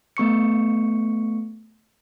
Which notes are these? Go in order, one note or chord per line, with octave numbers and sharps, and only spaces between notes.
A3 B3 C#6 C#7